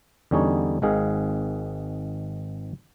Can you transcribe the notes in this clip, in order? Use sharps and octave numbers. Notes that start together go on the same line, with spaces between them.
E2 D3 G3 C#4 D#4 C#5
G#1 G#2 D#3 G#4 F5